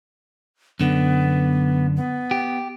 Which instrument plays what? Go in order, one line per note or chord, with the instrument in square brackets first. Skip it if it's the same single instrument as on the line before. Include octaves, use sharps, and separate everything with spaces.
[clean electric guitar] F#2 D3 [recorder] B3
[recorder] B3
[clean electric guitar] G4